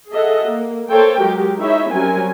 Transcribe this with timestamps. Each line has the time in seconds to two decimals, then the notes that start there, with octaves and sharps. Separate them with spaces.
0.11 G#4 A4 D#5 E5 F#5
0.46 A#3
0.90 A#3 A4 C5 C#5 G5
1.21 F#3 G#3 G4 A#4
1.58 D#4 E4 G#4 C#5 E5
1.91 F#3 G3 C4 C#4 A#4 G#5